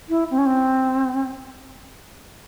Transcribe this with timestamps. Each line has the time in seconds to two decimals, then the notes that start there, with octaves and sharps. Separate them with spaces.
0.09 E4
0.30 C4
0.38 C#4
0.46 C4